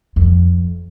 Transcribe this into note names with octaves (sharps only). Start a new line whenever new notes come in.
F2